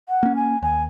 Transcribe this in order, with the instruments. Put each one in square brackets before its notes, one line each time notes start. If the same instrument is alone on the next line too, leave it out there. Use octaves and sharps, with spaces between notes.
[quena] F#5
[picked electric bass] A#3 C#4
[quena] G#5
[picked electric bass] D#2 [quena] G#5